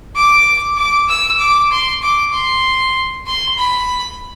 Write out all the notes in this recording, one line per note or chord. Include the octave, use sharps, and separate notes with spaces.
D6
D6
E6
D6
C6
D6
C6
C6
B5